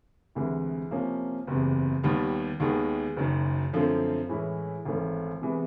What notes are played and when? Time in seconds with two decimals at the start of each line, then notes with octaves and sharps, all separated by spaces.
0.35 D2 C3 E3 G#3
0.91 C3 F3 A#3 C#4
1.47 F#1 E2 C3
2.04 D#2 D#3 G3 B3
2.60 D#2 D#3 G#3 B3
3.17 F#1 F#2 D#3
3.73 F#2 D3 F3 A3 C4
4.29 A2 E3 G#3 C#4 E4
4.85 G#1 G#2 E3 A3 C#4
5.42 C3 E3 G#3 B3